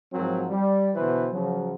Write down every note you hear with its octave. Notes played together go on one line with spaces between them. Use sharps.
G#2 F3 F#3 C4 A#4
G3
B2 D3 E3 B4 C5
C#3 F3 F#3